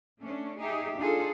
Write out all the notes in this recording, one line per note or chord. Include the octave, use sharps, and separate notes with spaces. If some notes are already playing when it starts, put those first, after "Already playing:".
A3 C#4 D4
D#4 G4 G#4 E5
D4 D#4 F4 G#4 A4